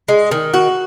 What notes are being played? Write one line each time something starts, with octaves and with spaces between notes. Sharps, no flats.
G#3
D#3
F#4